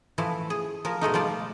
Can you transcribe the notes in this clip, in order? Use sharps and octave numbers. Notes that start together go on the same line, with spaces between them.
E3 F3 A3 E4
G#4
F3 A#4
B2 G#3 A3 D#4
F3 G3 F4 D5